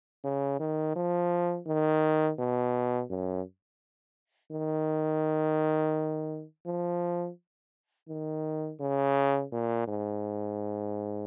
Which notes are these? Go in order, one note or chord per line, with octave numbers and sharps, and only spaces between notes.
C#3
D#3
F3
D#3
B2
F#2
D#3
F3
D#3
C#3
A#2
G#2